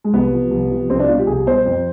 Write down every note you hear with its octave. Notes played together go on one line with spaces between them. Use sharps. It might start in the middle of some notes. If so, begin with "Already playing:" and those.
G#3
C2 B3
C3 F3
C2
C3 F3
C2 C4
D4
B2 G3 F4
G4
C2 G#4
B2 G3 C5
F2